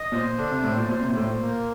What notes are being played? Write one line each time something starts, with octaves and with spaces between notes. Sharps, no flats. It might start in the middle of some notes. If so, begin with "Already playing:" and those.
Already playing: D#5
A#2 C5
D3 D4
C3
A2 C5
A#2
A#2 C5
C3
A#2
A2 C5
A#2
A#3